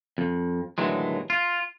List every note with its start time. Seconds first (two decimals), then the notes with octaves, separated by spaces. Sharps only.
0.18 F2
0.78 D#2 A2 D3 E3 F#3 G#3
1.30 F4